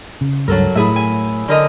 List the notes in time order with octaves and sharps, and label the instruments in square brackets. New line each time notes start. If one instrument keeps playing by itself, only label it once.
[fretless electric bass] C#3
[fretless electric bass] C#2 G2 [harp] F#3 A4 A#4
[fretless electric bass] A2 [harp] E4 G#4 E5
[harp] G#5
D3 A#4 D#5